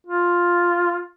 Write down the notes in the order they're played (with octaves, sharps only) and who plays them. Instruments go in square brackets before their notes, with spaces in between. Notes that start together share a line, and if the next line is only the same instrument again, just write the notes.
[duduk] F4